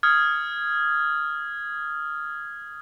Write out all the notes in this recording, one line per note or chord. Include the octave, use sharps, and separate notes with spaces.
D#6 F6 G#6